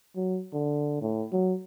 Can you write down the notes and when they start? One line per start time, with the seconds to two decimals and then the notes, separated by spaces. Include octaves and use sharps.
0.16 F#3
0.53 D3
1.01 A2
1.32 F#3